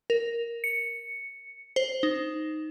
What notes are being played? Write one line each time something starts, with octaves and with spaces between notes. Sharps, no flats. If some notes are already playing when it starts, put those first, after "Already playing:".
A#4
C#7
C5
D#4